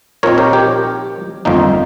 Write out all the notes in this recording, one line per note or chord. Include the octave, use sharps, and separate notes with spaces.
A#1 A#2 F3 C4 D#4 A#4 C#5
G4 A#4
G4
G1 F2 D#3 A#3 D#4